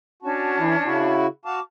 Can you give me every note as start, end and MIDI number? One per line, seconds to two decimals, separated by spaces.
0.22 1.14 61
0.22 1.14 62
0.22 0.58 66
0.22 1.14 81
0.59 0.76 52
0.59 0.76 64
0.85 1.27 49
0.85 1.27 64
0.85 1.27 66
1.45 1.60 66
1.45 1.60 77
1.45 1.60 81
1.45 1.64 86